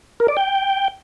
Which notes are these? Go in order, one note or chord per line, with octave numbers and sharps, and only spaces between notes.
A#4
D5
G5